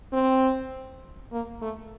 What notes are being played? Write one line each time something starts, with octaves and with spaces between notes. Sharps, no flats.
C4
A#3
A3